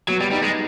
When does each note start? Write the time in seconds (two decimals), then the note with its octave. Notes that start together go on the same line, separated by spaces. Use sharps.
0.08 F#3 B3
0.21 G3
0.31 G3 D#4
0.43 G#3